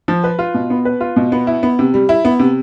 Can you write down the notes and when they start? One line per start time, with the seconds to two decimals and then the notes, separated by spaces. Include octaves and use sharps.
0.08 F3
0.24 B4
0.39 F4
0.54 B2
0.70 B3
0.85 B4
1.01 F4
1.16 B2
1.32 B3
1.47 E4
1.63 B3
1.79 C3
1.94 G3
2.09 E4
2.25 B3
2.39 C3